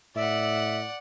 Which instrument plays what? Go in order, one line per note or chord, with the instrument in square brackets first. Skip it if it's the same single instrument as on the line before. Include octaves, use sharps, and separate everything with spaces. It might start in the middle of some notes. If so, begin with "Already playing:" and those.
[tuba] A2 [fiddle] D5 F#5 [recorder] E5